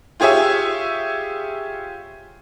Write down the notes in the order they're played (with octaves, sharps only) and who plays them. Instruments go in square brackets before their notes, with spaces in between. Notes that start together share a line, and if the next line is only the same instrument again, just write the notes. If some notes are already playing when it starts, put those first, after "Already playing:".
[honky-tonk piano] F4 G4 G#4 C#5 E5